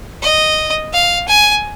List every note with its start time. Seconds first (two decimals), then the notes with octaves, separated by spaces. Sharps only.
0.22 D#5
0.93 F5
1.28 G#5